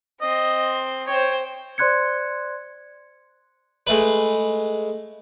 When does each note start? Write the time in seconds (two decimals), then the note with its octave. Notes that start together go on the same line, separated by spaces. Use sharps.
0.21 C4 D#5 C6
1.07 C5 C#5 G5
1.78 C5 D5 C6 F#6 G#6 C#7
3.87 G#3 A3 B4